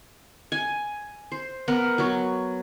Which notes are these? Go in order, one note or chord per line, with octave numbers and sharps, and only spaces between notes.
G#5
C5
B3 A#4 F#5
F#3 B3 F#4